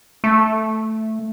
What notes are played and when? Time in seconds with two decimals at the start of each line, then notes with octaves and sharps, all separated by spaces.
0.24 A3